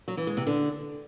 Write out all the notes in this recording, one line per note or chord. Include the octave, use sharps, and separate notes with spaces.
F#3
E3
G#3
C3
D3